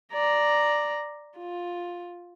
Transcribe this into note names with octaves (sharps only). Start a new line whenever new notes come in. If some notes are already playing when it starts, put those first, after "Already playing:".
D5 A#5
F4